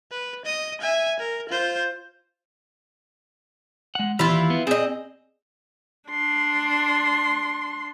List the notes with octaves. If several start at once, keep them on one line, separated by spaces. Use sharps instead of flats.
B4
D#5 D#6
E5 G#5
A#4
F4 C5
G#3 F#5
D#2 E3 E4 F4 G4
B3
C4 G#4 D#5
D4 C6